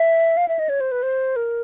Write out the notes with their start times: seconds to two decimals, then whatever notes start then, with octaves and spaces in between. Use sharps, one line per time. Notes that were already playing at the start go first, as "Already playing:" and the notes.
Already playing: E5
0.37 F5
0.48 E5
0.59 D#5
0.69 C#5
0.81 C5
0.92 B4
1.03 C5
1.36 A#4